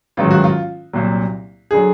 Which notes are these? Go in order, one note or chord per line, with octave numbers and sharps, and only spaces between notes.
A1 G#2 D#3 F#3 F4
F#4
F4
C2 A#2 F#3
D3 F#3 G#4